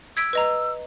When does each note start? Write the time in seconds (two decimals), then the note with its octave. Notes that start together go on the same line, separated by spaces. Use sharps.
0.17 E6 G#6 B6 D7
0.33 B4 D#5 A#5